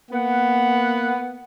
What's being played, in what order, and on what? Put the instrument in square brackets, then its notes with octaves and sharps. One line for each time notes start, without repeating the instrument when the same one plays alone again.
[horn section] A#3 B3 F#5